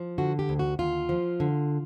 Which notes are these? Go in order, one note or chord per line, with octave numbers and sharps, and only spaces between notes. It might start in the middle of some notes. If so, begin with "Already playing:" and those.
Already playing: F3
D3 F#4
G4
D2
F#4
D#2 F4
F3
D3